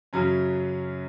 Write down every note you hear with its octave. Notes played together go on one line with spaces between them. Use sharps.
F#2 C#3 F#3 C#4